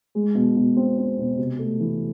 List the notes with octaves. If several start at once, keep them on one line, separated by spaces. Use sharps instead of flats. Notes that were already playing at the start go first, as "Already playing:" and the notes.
G#3
B2
B2
C4
C4
B2
C3
A3
E3